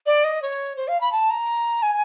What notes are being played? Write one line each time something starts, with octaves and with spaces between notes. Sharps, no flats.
D5
D#5
C#5
C5
F5
B5
A5
A#5
G#5